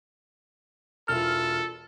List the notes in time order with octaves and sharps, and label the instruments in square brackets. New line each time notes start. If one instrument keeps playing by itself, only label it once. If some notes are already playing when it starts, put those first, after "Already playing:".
[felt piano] E1 E3 F4 [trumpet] A4 [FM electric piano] F6